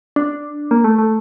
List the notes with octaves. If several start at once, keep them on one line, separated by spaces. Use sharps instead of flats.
D4
A#3
A3
A3